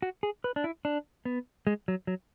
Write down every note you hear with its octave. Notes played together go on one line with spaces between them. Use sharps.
F#4
G#4
B4
D4
E4
D4
B3
G#3
F#3
F#3